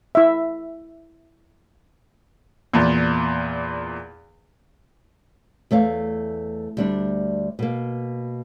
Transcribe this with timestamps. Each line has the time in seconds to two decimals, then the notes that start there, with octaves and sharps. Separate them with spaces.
0.15 E4 E5
2.74 E2 A#2
5.71 E2 A3 C#5 F5
6.77 D2 G3 D4
7.59 B2 A#3